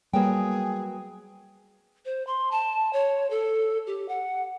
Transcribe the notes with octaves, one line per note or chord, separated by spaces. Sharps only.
F#3 G3 A#3 B3 G#4 G5
C5
C6
A5
C#5
A4
G4
F#5